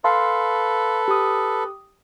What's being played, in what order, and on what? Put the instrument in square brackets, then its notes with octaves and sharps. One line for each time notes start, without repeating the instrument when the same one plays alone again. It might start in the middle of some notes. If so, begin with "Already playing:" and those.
[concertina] A4 B4 [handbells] F5 A5 C6
[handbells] G4 D#6